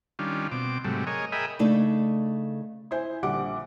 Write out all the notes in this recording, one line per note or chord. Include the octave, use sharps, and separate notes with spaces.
D#3 G3 C#4 D4 F4
B2 C4 D6
G#2 C3 F#3 G3 A3
G#4 A#4 C#5 D#5
G#4 A#4 D#5 E5 G5 B5
C#3 A3 D4 D#4
E4 C5 G#5
A#1 D3 G3 F#5 D6 D7